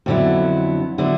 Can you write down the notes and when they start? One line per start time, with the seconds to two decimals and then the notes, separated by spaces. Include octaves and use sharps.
0.06 F2 D3 F#3 B3 E4
0.98 D3 F#3 B3 E4